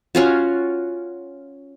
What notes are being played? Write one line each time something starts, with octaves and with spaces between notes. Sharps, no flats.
C#4 F4 F#4